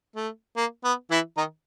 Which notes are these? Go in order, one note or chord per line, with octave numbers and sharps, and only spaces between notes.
A3
A#3
B3
E3 E4
D#3 D#4